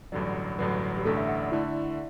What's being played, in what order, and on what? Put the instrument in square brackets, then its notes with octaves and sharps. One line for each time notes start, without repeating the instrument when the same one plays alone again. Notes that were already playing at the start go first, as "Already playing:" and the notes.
[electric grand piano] A1 G2 D3 F#3 [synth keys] D5
[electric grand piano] A1 G2 D3 F#3 [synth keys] B4
[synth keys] G4
[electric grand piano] A1 G2 D3 A3 [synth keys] A4
[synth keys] E5
F#5
D5
[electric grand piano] D3 A3 [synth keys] E4